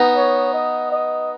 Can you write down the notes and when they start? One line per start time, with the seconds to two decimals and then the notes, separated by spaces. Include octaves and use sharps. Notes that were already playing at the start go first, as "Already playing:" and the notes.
Already playing: B3 D#4
0.16 C#5
0.54 D#5
0.92 D#5